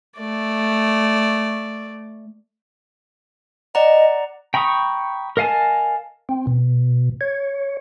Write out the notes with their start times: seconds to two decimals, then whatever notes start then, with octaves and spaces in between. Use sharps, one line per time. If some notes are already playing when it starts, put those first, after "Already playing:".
0.19 A3 D5
3.75 D5 D#5 F#5 A#5
4.54 G5 A#5 B5 C#6 D#6
5.37 A#4 D#5 F5 G#5 A5
6.29 C4
6.47 B2
7.21 C#5